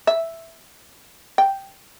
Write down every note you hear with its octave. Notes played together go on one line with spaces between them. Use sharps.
E5
G5